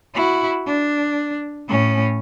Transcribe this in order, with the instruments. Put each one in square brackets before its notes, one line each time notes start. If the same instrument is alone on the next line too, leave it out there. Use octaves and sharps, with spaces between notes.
[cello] E4 F#4
D4
A2 C#4